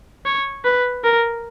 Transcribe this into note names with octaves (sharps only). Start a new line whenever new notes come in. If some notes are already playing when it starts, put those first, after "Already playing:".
C#5
B4
A#4